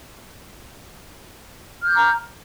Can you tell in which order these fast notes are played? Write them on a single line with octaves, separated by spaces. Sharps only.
F6 G6 D6 A#5